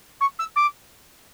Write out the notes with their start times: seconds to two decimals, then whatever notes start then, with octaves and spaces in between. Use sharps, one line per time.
0.20 C#6
0.39 E6
0.56 D6